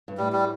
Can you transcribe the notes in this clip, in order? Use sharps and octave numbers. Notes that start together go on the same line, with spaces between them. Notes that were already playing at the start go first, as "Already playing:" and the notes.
G2
A2 G3
G3